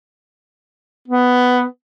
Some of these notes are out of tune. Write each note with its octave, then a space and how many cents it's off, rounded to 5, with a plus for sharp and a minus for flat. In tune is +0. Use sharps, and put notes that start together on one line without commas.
B3 +10